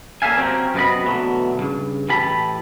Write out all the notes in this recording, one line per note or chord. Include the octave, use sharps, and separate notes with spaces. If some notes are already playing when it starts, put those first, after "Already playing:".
A#3 A4 D5 E5 F5 G#5
C3 F#3 A#3 C4 C#4 G4
F#2 C3 B3 D#5 B5
B2 D3 E3 F#3 A3
B1 G2 C#3
A2 E3 G4 A5 B5